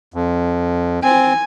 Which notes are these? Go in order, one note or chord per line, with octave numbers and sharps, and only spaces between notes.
F2
C4 G#5